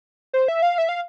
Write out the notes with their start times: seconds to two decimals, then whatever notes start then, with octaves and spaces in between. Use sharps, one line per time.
0.33 C5
0.48 E5
0.62 F5
0.78 E5
0.89 F5